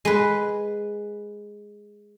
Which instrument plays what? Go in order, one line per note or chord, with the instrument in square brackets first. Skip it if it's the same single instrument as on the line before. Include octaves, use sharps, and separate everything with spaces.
[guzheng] G#3 B4